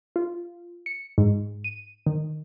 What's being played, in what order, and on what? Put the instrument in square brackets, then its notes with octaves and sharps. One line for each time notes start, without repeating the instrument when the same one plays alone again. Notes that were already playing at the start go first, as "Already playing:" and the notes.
[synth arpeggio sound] F4
C#7
G#2
D#7
D#3